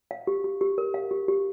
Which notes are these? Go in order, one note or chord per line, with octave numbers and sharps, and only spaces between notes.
F5
G4
G4
G4
A#4
F5
G4
G4